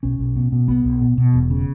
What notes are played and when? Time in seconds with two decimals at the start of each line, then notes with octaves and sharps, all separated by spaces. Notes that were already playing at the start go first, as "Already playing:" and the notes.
0.03 B1 C#4
0.19 B1
0.36 B2
0.52 B2
0.68 B1 B3
0.84 B1
1.02 B2
1.18 B2
1.34 E1
1.51 C#3